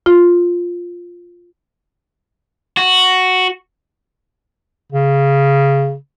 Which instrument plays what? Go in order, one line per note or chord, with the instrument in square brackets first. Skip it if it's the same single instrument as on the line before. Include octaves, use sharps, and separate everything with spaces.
[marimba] F4
[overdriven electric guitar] F#4
[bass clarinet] C#3